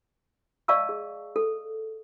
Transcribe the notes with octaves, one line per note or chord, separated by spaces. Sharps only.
D5 D#5 F5 A5 C#6 E6
G#4
A4